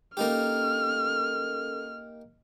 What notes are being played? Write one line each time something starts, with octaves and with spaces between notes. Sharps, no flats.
A#3 C#4 D#4 G4 A4 A#4 F6